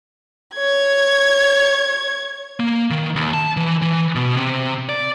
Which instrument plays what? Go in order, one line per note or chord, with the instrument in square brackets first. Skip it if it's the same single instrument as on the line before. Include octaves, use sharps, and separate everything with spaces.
[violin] C#5 G#6
[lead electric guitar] A#3
D#3
D#2
A5
E3
E3
B2
C3
D5